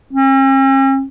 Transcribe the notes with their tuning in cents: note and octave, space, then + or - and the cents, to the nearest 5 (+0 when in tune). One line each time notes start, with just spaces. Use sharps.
C#4 -45